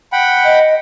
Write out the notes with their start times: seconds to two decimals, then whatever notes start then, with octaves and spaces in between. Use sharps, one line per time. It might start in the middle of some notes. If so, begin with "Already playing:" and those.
0.13 F#5 G5 B5
0.45 D#5